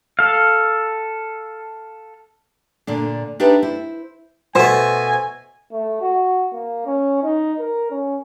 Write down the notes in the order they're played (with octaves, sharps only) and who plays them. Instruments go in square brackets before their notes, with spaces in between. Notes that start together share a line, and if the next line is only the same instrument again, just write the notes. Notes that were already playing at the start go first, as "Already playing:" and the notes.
[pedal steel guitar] A4 F5
[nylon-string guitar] A#2 D3 D4
D4 D#4 G4 B4 D5 E5
E4 C5
[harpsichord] B2 A3 [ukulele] C5 [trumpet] G#5
[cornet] A3
F#4
A#3
C#4
D#4
A#4
C#4